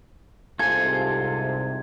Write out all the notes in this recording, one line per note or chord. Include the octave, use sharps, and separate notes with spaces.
C2 G#2 C3 F4 A4 G#5 G#6